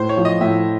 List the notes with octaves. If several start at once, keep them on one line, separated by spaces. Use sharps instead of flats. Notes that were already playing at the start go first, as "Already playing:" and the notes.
Already playing: A2 C5
C#5
F3
D#5
A2 E5